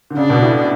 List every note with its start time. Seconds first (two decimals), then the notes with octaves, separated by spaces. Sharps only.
0.10 D3
0.17 C#3 D4
0.30 B2
0.42 A2